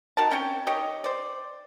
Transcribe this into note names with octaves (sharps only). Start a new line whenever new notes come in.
D#3 F#4 A#4 A5
C4 C#4 F#4 G5
D#3 G4 C#5 D#5
C5 D5